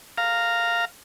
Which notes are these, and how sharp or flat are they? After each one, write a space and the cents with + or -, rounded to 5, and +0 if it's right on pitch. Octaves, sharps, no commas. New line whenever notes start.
F5 +0 A#5 -10